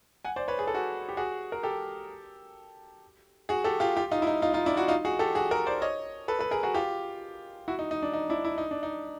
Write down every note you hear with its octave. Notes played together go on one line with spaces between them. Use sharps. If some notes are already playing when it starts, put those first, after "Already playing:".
F#5 G#5
C5 D5
B4 C#5
G#4
A4
F#4 G#4
G4
F#4 G#4
A#4
G4 A4
F#4 G#4
G4 A4
F4 G4
F4 G4
D#4 F4
E4
D#4
D#4 F4
D#4 F4
D4 E4
E4 F#4
D#4 F4
F#4 G#4
G4 A4
F#4 G#4
G#4 A#4
C5 D5
C#5 D#5
A4 B4
A4 B4
G#4 A#4
F#4 G#4
F4 G4
E4 F#4
D#4
D#4
D4
D#4
D4 E4
E4
D#4
D4
D#4